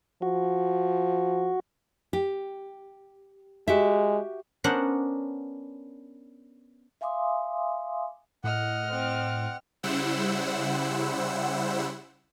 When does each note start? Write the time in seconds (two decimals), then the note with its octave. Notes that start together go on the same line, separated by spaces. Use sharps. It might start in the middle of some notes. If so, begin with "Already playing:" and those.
0.22 F3 F#4
2.13 G4
3.67 G#3 F#4 G4 E5
4.64 B3 C#4 D4 A#4 C5 F#5
7.01 E5 F5 G#5 C6 D6 D#6
8.44 A2 D#5 F#5 F6
8.91 C4 F#5
9.83 C#3 G3 E4 C5 F#5 E6